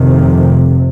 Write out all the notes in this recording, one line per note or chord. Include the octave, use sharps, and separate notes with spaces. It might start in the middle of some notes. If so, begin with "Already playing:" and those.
Already playing: F1 F2 C3 D#3